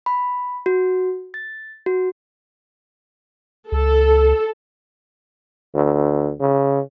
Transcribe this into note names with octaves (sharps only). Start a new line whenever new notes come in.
B5
F#4
A6
F#4
C#2 A4
D2
C#3